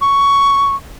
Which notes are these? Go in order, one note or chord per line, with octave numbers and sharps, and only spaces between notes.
C#6